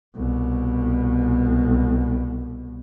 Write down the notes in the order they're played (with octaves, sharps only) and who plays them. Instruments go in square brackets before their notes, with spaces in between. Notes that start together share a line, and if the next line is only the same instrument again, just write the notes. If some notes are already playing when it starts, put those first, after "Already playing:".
[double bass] C2 B2